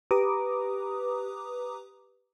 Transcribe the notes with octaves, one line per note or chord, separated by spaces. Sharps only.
G4 B4 A#5 D6 D#6